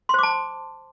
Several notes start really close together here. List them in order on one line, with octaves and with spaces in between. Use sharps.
C6 C5 D6 A5